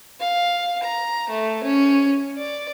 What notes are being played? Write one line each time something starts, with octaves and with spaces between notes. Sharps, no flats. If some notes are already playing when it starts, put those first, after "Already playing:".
F5
A#5
A3
C#4
D5